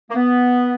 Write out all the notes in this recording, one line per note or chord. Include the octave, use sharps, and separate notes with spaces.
A#3
B3